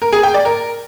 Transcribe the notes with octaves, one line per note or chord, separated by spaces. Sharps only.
A#4
G#4
G5
D5
A#4